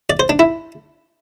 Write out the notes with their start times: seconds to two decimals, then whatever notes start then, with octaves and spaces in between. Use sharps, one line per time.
0.10 D5
0.20 C5
0.29 D4
0.39 E4